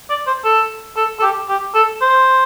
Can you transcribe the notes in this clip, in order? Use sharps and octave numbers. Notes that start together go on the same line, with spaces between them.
D5
C5
A4
A4
A4
G4
G4
A4
C5